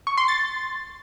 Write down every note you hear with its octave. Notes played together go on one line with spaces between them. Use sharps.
C#6
C6
A6